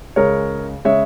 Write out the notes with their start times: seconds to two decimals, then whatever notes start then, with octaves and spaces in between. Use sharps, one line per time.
0.16 C#2 C#3 G#3 A#4 C#5
0.85 C#3 G#3 C#5 E5